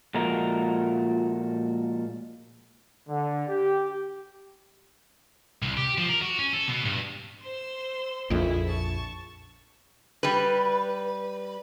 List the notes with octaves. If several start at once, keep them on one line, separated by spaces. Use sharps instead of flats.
A#2 F3 G#3 A3 F#4 A#4
D3
G4
C2
G4
F3
A#4
F#4
C#4
A4
B2
G2
C5 C6 E6
A#1 F2 E4 G#4 E5
A5 C#6
G3 B4